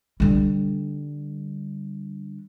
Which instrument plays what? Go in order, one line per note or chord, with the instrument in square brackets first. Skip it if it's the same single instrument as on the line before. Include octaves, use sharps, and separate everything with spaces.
[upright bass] D3 G3